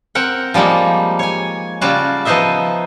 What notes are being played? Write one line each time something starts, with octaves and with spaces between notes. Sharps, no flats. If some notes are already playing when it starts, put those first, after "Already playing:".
C4 A#4 F#5 G5
F3 G3 G#3 A#3 D#4
C#5 G#5
C#3 G3 F4 F#4 A5
F3 B3 D#4 C5 D#5 E5